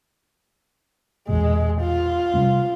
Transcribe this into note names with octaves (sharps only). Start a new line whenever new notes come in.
A#1 E2 B2 G#3
F4
C3 G3 C#4